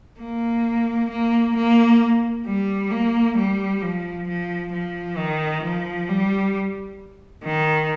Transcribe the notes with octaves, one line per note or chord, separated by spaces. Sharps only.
A#3
A#3
A#3
G3
A#3
G3
F3
F3
F3
D#3
F3
G3
D#3